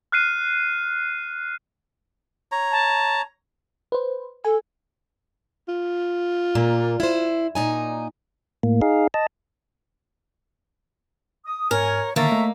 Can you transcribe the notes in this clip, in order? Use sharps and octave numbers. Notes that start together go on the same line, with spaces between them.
F6 F#6 C7 D#7
C#5 A#5
A5
B4 C5
A4 G#5
F4
A#2 A#3
E4 C5
A#2 D#4 G#5
A2 A#3
D#4 G#4 F5
D#5 A5
D#6
G#2 A#4 C#5 G#5 F6
D3 D#3 A#3 A4 C#5 E5 A#5 A6
A3 D#5